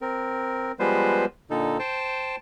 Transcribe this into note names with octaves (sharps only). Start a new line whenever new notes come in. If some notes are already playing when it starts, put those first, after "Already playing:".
C4 A#4
F3 G3 G#3 B3 B4 C5
A#2 D3 D#4 A4
C5 G5 A5